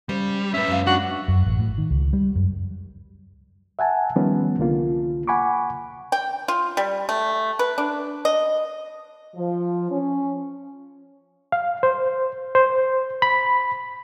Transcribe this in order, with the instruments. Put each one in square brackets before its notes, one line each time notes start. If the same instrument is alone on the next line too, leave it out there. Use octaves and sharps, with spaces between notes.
[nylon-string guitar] C#3 C5 [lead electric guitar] G3
[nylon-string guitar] A2 A#3 [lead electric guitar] C#4 B4 [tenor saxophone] E5
[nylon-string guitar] F#2 G#3 F5
[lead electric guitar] D4 [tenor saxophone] F#4
[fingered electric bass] F#2
A1
A2
D#3
C#2
G3
F#2
[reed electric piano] E5 F#5 G#5 A5
D#3 F3 G3 B3 C#4
C2 D3 A#3 F4
F#5 G#5 B5 C#6 D6
[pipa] G5
F4
G3
A3
B4
D4
D#5
[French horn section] F3
C#4
[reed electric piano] F5
C5
C5
B5